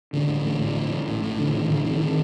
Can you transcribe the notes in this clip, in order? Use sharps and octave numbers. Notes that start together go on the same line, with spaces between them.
A1 D3
A1
A2
A2
A1
A1
A2
A2
A1 D3
A1 D#3
A2 D3 E3
A2 D#3
D#3